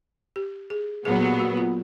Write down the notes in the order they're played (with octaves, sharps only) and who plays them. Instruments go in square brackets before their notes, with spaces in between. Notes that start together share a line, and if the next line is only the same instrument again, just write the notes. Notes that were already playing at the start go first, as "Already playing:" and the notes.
[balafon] G4
G#4
[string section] A#2 F#3 B3 [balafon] G#4
[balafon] G4
F#4
F4